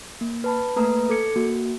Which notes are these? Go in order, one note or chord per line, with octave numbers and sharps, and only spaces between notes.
A#3
B4 A5 B5
A3 A#3 B4 A#5 D#6
A4 D6 G#6 C#7
A#3 F#4